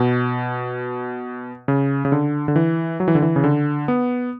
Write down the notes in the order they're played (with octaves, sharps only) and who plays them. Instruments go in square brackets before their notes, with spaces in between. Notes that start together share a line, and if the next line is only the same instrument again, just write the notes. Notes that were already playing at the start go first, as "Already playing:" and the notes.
Already playing: [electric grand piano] B2
C#3
C#3
D3
D3
E3
F#3
E3
D3
E3
C#3
D3
B3